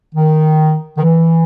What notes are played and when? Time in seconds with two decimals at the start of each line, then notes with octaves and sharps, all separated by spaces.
0.15 D#3
0.98 D#3
1.02 E3